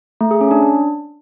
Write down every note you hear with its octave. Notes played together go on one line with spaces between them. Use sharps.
A3
G#4
C#4
D4